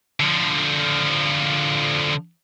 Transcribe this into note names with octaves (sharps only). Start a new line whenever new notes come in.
D3 F3